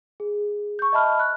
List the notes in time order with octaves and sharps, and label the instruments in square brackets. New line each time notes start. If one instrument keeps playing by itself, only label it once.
[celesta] G#4
C#6 G6
D#5 E5 A5 B5 F6
F#6